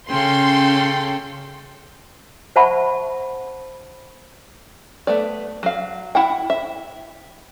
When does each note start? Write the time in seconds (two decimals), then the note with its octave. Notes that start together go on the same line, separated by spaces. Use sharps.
0.11 C#3 C#4 A4 G5 C6
2.56 C5 E5 F#5 A5 B5 C#6
5.07 A3 B3 D5
5.63 F#3 F5
6.15 E4 F#5 G5
6.50 E5